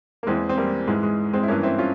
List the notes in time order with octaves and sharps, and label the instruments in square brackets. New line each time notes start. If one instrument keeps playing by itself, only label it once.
[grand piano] A#3
E2 E3 G#3 C4
C4
G3 A#3
G#2 E3 G#3
G#3
G#3 C4
E4
G2 E3 A#3 C#4
C4 E4
C#4 F4